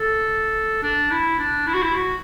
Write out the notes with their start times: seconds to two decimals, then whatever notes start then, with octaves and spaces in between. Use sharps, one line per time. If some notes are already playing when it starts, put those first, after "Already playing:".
Already playing: A4
0.82 D4
1.11 E4
1.39 D4
1.67 E4
1.74 F#4
1.83 E4
1.95 F#4